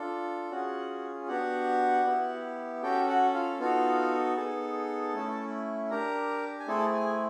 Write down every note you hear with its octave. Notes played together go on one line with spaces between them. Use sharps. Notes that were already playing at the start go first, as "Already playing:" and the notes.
Already playing: D4 F4 A4
C#4 F4 F#4 G#4 F#5
B3 D4 F#4 G4 F#5
B3 E4 G4
C#4 F#4 G4 A4 G5
F#4 F#5
F4 F5
B3 D#4 F4 F#4 A4 F5
B3 D#4 G#4 A4 A5
A3 C#4 E4
D4 G4 A#4 A#5
G#5
A3 C4 E4 G#4 A4 A5
G#4 G#5